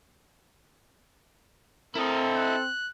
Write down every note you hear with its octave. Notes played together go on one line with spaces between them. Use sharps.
C4 E4 A4 A#4 D#5
F#6